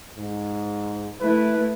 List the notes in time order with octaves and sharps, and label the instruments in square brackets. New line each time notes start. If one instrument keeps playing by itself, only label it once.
[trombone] G#2
[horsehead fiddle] A3 E4 [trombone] B4